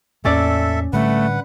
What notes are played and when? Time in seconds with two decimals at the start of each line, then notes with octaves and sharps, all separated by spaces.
0.25 E2 A2 A#3 C#4 A4 D5 E5
0.93 A2 D3 G3 A3 B4 F#5